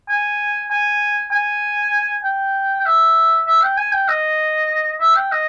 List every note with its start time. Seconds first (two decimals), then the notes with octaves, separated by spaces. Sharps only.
0.09 G#5
0.71 G#5
1.31 G#5
2.24 G5
2.81 G5
2.86 E5
3.47 E5
3.62 G5
3.77 G#5
3.92 G5
4.08 D#5
5.00 E5
5.15 G5
5.32 D#5